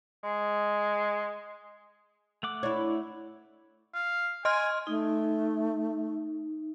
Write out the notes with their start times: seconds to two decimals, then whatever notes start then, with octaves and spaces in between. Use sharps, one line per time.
0.24 G#3
2.43 A3 F#5 D6
2.63 D4 E4 C#5
3.94 F5
4.45 D#5 G#5 C6 F6
4.87 A3 D#4